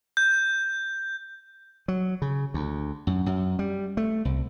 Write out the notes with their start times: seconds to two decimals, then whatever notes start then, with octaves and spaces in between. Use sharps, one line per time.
0.17 G6
1.88 F#3
2.22 C#3
2.54 D2
3.07 F#2
3.26 F#2
3.59 G3
3.97 A3
4.25 C2